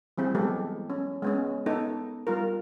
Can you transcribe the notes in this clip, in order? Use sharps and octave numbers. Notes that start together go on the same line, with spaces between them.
E3 G3 C4 G#4
E3 F#3 G#3 B3 G4 A4
C#4
G#3 B3 C#4
B3 D#4 A4
G3 F4 A#4